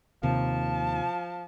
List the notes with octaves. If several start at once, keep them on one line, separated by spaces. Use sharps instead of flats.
D#2 C3 F3 A5